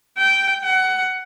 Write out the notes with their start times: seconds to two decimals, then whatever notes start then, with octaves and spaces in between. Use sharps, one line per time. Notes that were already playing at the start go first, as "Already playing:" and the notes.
0.18 G5
0.64 F#5